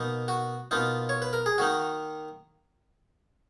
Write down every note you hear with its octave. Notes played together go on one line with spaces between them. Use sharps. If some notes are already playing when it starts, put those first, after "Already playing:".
Already playing: B2 A#3 D#4
F#4
B2 A#3 D#4 F4
C#5
B4
A#4
G#4
D#3 A#3 D#4 F#4